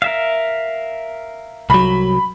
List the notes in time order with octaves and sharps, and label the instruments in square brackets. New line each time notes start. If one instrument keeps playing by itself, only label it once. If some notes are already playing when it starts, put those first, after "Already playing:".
[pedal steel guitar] A#4 E5 F5
[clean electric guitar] C2 F#3 [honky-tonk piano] B5